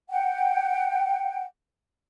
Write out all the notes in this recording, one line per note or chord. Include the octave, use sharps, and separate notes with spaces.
F#5 G5